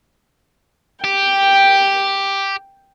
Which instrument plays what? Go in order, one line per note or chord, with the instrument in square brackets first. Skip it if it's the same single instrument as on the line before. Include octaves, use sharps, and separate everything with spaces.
[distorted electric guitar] G4 [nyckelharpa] G5